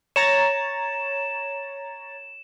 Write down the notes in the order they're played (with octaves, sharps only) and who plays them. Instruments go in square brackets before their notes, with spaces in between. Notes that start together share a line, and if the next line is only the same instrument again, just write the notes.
[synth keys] C#5 A#5 A6 [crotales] E7